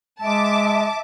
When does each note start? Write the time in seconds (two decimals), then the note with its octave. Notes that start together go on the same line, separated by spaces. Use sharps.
0.22 G#3 E5 A5 D6